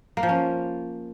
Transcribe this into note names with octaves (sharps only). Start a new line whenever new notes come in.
A#3
F3
C#4